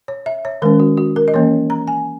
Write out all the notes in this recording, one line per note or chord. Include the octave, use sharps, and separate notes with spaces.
C#5
E5
C#5
D#3 G#3 C#4 A#4
F#4
F#4
A#4
D#5
E3 A#3 C#4 C#5
A#5
G#5